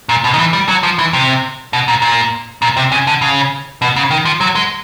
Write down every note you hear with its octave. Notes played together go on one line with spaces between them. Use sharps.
A#2
B2
D#3
E3
G3
F#3
F3
E3
C3
B2
A#2
A#2
A#2
C3
C#3
D3
C#3
B2
C#3
D#3
F3
F#3
G#3